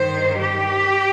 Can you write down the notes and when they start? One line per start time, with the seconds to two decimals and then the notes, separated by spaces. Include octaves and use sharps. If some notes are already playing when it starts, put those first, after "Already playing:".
Already playing: G2 D#3 C5
0.37 G4